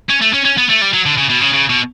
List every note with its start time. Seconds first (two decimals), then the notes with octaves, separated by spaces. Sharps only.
0.10 C#4
0.22 A3
0.34 C#4
0.45 C#4
0.58 B3
0.70 A3
0.82 G3
0.93 F#3
1.06 D3
1.18 C#3
1.30 B2
1.41 C#3
1.54 C#3
1.69 B2